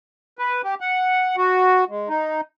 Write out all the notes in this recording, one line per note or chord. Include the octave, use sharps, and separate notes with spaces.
B4
G4
F#5
F#4
G#3
D#4